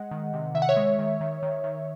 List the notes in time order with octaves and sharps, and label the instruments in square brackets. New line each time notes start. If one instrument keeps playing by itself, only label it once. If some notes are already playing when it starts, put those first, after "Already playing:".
Already playing: [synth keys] G#3 D#5 F#5
D#3
C3
D#3 E5
F#5
C#5 E5
G#3
D#3
D#3
D#3
D#3